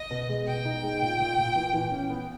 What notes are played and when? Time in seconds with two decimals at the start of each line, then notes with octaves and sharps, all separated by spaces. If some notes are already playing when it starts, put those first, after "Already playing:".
Already playing: D#5
0.11 B2
0.29 G#3
0.47 B2 G5
0.65 D#4
0.83 G#3
1.01 A#2
1.20 A#2
1.37 A#2
1.56 E3
1.73 E3
1.91 C#4
2.10 B3